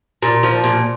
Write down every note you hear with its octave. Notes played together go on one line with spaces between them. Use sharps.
A#2
F3
A#2